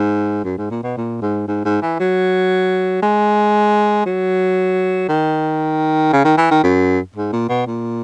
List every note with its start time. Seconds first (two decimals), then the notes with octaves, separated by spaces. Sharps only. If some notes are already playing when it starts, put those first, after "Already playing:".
Already playing: G#2
0.45 F#2
0.58 G#2
0.71 A#2
0.83 B2
0.97 A#2
1.22 G#2
1.47 G#2
1.65 G#2
1.82 E3
2.00 F#3
3.02 G#3
4.06 F#3
5.09 D#3
6.13 C#3
6.25 D#3
6.38 E3
6.51 D#3
6.64 F#2
7.15 G#2
7.33 A#2
7.49 B2
7.67 A#2